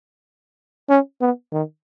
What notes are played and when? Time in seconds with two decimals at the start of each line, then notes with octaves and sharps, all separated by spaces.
0.89 C#4
1.21 B3
1.53 D#3